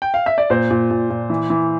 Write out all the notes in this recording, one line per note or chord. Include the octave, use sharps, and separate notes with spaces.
G5
F5
E5
D5
A#2 C5
A#2
A#2
A#2
E3
E3